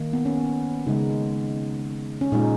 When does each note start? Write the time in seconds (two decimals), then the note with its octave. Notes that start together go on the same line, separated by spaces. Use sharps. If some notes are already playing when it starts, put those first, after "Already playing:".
Already playing: D#3 A#3
0.13 B3
0.25 C#4
0.37 B3
0.87 C#3 G#3 D#4
2.21 C#4
2.32 A#2 G#3 D#4